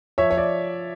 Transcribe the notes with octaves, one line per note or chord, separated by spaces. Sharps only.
F3 C#5 E5
C#5
D5